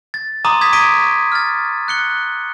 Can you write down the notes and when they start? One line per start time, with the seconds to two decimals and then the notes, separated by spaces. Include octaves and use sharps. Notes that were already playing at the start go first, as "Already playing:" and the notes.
0.14 A6
0.45 A#5 C6 D6 D#6 D#7
0.61 D#6 G#6 B6
0.73 C#6 B6 D7 D#7
1.32 F6 A6
1.88 F#6 C#7 G7